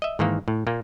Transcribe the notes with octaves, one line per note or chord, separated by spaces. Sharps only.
D#5 E5
G#2 D#3 E3 A#3
A2
A#2 A#3